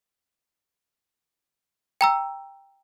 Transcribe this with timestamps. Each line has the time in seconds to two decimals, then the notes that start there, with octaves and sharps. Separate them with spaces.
2.01 G5 A#5 E6